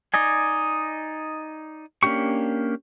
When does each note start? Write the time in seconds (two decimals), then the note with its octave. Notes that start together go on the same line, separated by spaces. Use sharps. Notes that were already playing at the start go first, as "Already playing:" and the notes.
0.14 D#4 D5 D#5 G#5
2.03 A#3 C#4 D4 G4 C#6